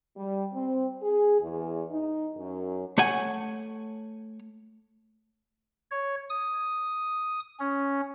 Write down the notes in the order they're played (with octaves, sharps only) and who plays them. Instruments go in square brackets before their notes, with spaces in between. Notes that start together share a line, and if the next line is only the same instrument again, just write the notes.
[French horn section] G3
C4
G#4
E2
D#4
F#2
[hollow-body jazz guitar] A3 C#5 F#5 G#5
[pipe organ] C#5
D#6
C#4